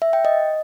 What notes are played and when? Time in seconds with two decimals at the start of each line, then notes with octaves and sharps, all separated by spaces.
0.02 E5
0.13 G5
0.25 D#5